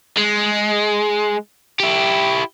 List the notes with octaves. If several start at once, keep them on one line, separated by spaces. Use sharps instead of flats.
G#3
E4 G4